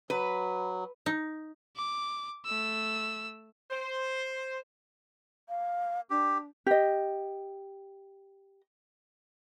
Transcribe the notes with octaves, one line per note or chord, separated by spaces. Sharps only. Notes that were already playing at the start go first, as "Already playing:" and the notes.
F#3 B4
D#4
D6
A3 E6
C5
F5
D4 G4
G4 D#5